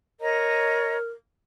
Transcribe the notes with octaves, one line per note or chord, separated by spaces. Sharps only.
A#4 C#5 D#5 A#5